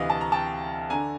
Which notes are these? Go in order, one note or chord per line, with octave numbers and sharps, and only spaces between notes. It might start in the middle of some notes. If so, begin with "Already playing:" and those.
Already playing: D2 C3 E3 B4 D#5 F5
A5
A#5
G5 A5
D3 G#5 A#5